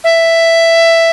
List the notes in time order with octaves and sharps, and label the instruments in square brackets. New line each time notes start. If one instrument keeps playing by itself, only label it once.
[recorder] E5